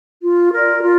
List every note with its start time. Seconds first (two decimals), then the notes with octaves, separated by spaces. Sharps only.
0.22 F4
0.53 A#4 D5
0.83 F4